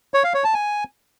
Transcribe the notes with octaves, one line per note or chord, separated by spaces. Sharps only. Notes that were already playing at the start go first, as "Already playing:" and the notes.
C#5
F5
C#5
A5
G#5